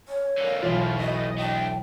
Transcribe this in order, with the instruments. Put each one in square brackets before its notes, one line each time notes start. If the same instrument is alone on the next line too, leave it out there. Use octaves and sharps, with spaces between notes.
[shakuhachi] C#5
[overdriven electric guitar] D3 A#3
[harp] E1 B1 [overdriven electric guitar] B2 A3 [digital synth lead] F4
[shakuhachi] F#4 [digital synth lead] D#5
[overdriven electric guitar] A3 D4 [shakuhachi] G5